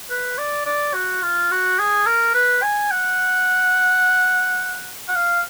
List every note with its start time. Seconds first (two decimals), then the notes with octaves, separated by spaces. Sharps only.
0.09 B4
0.38 D5
0.66 D5
0.94 F#4
1.22 F4
1.51 F#4
1.79 G#4
2.06 A#4
2.34 B4
2.63 G#5
2.91 F#5
5.08 F#5
5.15 F5